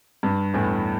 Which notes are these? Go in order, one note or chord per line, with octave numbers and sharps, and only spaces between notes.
G2
E2 A2